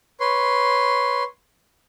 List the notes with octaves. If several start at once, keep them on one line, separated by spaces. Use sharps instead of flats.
B4 C#5 C6